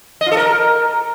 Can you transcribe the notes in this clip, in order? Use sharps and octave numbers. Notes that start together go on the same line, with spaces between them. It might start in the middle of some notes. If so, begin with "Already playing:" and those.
D#5
F4
A4
A#4